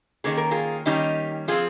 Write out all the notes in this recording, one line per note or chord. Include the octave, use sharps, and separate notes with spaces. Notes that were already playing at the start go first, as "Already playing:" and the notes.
D#3 A#3 C#4 G#4
A#4
F4 G#4
D#3 G3 A#3 C#4 D#4 G4
F3 C4 F4 G#4